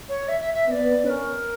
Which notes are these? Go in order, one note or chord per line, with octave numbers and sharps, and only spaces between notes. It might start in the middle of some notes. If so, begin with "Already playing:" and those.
C#5
E5
E5
E5
B3 D5 E5
C#4 B4
A#4